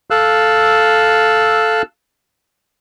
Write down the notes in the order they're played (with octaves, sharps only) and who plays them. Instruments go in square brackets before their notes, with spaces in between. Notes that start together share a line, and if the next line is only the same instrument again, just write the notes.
[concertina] A4 F5 E6 F#6